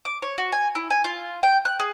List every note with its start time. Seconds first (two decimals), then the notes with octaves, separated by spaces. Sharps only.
0.05 D6
0.22 C#5
0.38 F#4
0.52 G#5
0.75 E4
0.90 G#5
1.04 F4
1.43 G5
1.65 F#6
1.80 G#4